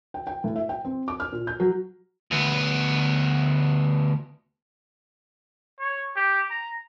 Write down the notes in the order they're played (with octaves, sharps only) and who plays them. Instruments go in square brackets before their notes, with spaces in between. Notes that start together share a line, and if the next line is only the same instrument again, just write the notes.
[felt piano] G5
G5
A2
E5
G5
C4
D6
F6
A#2
G6
F#3
[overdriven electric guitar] D2 B3
[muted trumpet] C#5
G4
A#5